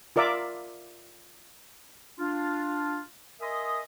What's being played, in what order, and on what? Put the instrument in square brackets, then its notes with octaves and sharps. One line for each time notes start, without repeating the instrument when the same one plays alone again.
[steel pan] F4 A#4 D5 E5 D6
[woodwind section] D4 F4
A#4 D#5 E5 G#5 C6 D#6